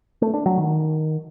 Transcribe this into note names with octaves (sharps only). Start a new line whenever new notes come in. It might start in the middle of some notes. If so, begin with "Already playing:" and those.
A3
D4
F#3
D#3